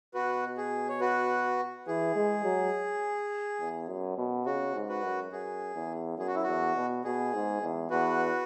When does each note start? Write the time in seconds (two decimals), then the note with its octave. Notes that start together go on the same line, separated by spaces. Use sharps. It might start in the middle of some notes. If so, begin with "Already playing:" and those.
0.14 B2 F#4 B4
0.57 G#4
0.89 C#5
1.00 F#4 B4
1.87 E3 G#4
2.15 G#3
2.44 F#3
3.60 E2
3.88 F#2
4.18 B2
4.46 C#3 F#4
4.75 G#2
4.89 F#4 B4
5.03 F#2
5.31 F#2 G#4
5.75 E2
6.18 F#2 G#4
6.27 F#4
6.35 E4
6.43 E2 F#4
6.76 B2
7.04 B2 G#4
7.34 G#2
7.62 E2
7.90 E2 F#4 B4